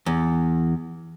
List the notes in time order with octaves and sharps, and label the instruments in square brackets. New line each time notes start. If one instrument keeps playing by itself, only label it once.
[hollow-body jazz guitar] E2